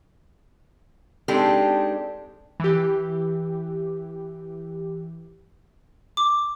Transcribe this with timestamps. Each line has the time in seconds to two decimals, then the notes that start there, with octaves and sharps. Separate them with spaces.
1.28 G#3 C4 D4 D#4 G4 A4
2.60 E3 G4
6.17 D6